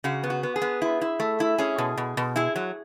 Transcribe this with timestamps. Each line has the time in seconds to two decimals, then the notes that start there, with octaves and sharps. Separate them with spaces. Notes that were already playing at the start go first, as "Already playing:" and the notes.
0.04 C#3 F#4
0.24 B3
0.30 F#4
0.43 B3
0.56 G#4
0.62 B3
0.82 E4
1.01 E4
1.20 A3
1.40 E4
1.58 C#4 G#4
1.78 B2
1.97 B2
2.17 B2
2.36 E4 G#4
2.56 F#3